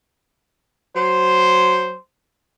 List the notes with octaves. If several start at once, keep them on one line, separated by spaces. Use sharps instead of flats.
F#3 C5